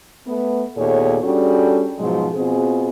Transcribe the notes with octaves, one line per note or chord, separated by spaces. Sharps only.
A3 B3
D#2 A#2 B3 G#4 A4 C#5
G3 C#4 D4 F#4 G#4 A4
G#2 B2 F3 F#3 G#3
B2 C4 F4 G#4